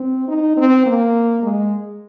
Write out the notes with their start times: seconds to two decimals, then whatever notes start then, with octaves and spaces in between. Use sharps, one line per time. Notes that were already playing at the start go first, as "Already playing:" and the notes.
Already playing: C4
0.28 D#4
0.57 C4
0.86 A#3
1.43 G#3